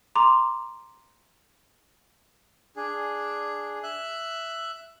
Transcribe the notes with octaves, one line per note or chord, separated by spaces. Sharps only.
A#5 C6 D6
D4 G#4
E5 F#6